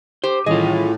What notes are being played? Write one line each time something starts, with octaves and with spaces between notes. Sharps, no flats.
G4 C5
A2 D#3 E3 G3 F4 G#4 D#5